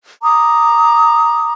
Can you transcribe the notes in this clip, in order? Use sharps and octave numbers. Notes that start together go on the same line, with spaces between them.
A#5 D6 D#6